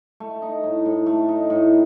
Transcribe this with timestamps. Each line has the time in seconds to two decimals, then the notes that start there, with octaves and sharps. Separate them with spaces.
0.20 A3
0.42 D#4
0.64 A2
0.86 A2
1.06 A3
1.29 D#4
1.50 A2